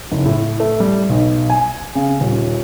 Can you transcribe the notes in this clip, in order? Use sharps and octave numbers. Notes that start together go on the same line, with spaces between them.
F#1
A2
A3
G3
B1
G#5
C#3
D#1